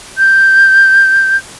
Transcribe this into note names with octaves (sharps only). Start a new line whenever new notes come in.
G6